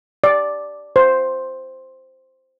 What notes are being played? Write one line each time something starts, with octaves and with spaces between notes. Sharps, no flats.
D5
C5